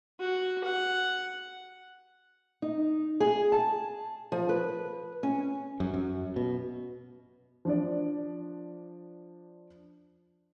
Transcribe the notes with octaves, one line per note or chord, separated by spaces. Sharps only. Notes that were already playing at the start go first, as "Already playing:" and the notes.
F#4
F#5
D#4
G#4
A5
F3
B4
C#4
F#2
F#2
B2
F3 D4 D5